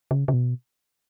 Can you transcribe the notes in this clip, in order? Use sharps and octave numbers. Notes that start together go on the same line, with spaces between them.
C#3
C#3
B2